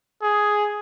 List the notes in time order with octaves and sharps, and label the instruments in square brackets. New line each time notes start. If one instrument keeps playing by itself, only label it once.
[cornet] G#4